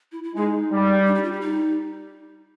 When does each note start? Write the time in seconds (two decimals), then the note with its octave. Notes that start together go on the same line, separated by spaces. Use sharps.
0.12 E4
0.24 E4
0.35 G#3 D#4
0.71 G3
1.06 D4
1.15 D#4
1.23 F4
1.32 G4
1.41 D#4